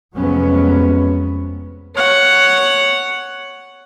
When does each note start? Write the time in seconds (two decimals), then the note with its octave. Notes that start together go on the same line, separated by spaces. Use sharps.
0.16 F1 F2 F#3 G#3 B3 C#4
1.95 C#5 F#5